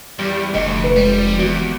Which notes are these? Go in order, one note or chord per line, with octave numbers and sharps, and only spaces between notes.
E2 G3
F1 D2 D#5
B4
G3 G#3
E2 E3 F#4